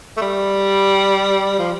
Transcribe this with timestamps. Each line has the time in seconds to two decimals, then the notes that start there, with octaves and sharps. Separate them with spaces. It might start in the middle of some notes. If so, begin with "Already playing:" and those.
0.17 A3
0.22 G3
1.59 F3